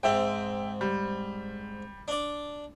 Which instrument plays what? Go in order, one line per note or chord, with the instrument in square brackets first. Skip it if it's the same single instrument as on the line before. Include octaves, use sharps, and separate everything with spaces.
[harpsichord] G#2 C4 [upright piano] E5 G5
[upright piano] G3
[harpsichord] D4 D5